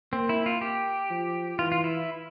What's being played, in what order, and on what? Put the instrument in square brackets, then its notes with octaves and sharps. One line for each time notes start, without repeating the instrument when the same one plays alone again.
[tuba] A#3 [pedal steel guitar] C4
[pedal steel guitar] E4
F4
G4
[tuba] F3
[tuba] E3 [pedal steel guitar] F4
[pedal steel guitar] F4
E4